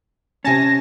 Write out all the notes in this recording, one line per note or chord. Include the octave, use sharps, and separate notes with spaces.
C3 C#4 G#5 A5 A#6